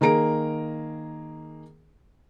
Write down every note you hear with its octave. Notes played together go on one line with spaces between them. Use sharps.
D#3 A#3 G#4 A#5 D7